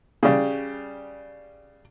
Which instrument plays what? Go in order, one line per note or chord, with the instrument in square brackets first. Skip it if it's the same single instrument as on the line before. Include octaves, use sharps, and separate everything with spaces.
[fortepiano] C#3 G3